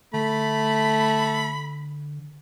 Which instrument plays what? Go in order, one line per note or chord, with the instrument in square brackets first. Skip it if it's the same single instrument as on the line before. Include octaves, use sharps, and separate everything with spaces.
[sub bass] D3 [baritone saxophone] A3 [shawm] B5